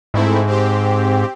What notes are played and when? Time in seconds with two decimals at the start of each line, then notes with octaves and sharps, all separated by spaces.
0.14 G#2 A3 C4 E4
0.47 C4 G4